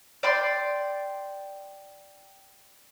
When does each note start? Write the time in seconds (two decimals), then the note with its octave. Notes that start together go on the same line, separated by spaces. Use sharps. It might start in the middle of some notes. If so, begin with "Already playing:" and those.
0.23 D5 G5 C6